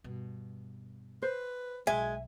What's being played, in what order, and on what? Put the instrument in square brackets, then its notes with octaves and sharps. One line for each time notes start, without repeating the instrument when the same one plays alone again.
[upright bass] G2 B2
[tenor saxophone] B4 [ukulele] C5
[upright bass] B1 F#3 [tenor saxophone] G#3 [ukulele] E5 [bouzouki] G#5